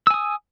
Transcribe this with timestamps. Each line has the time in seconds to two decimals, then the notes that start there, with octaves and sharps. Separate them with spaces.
0.07 E6
0.10 G#5
0.14 D#6